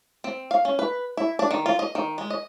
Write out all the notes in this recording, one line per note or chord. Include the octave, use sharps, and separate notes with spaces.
C4
F5
C#4
B4
E4
D4
D#3
F4
D#5
D#3
G#3
D#5